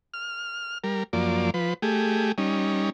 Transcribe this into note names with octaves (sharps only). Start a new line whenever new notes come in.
F6
G3 A#4
F#2 F3 A#3 D5
F3 B4
A3 G4 G#4
G3 C#4 D#4